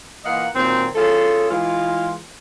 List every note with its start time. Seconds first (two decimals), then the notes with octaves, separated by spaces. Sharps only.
0.24 E3 A#3 F4 D#5 F5 F#5
0.54 A#2 D#3 F#3 C4
0.95 C#4 F4 G#4 A4
1.49 E3 G#3 F4